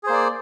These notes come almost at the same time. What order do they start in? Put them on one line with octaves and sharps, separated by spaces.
G#4 C5 A#3 D5